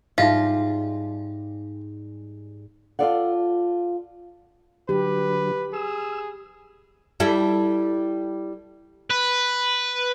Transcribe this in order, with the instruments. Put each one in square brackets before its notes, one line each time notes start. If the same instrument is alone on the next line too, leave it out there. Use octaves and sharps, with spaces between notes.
[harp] G#2 G3 [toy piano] D#4 E5 F5 [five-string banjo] F4
[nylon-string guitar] F4 F#4 A4 D5 F5 F#5
[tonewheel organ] D3 F#3 [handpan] G4 [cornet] B4
[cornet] G#4 [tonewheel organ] E6
[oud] G3 E4 A4
[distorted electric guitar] B4